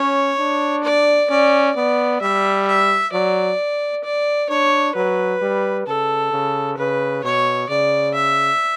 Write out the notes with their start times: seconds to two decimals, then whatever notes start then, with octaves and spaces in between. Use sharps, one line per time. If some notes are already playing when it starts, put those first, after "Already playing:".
Already playing: C#4 C#5
0.39 D4
0.84 D5
1.30 C#4 D5
1.76 B3 D5
2.21 G3 E5
2.67 E5
3.12 F#3 D5
4.04 D5
4.49 D4 C#5
4.95 F#3 B4
5.41 G3
5.87 C#3 A4
6.32 C#3
6.77 C#3 B4
7.24 B2 C#5
7.69 C#3 D5
8.14 E5